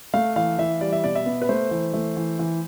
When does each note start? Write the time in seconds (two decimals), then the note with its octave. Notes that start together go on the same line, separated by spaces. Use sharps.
0.14 A3 F5
0.36 E3 F5
0.58 E3 E5
0.81 G3 D5
0.93 E5
1.04 B2 D5
1.15 E5
1.26 B3
1.42 B4
1.49 A3 C5
1.71 E3
1.93 A3
2.17 E3
2.39 E3